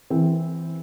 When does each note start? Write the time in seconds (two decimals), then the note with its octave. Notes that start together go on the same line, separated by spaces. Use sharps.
0.10 E3 C4